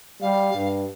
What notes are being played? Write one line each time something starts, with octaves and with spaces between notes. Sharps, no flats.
G3 F5
G2